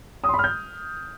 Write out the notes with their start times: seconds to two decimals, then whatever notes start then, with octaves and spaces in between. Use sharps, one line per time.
0.24 D#6
0.29 C6
0.34 B5
0.39 F6
0.44 G6